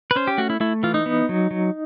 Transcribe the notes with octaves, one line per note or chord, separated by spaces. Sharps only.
B4
C#4 C5
G4
A3 F#4
E4
A3 E4
E3 F4
D#4
B3
F#3
F#3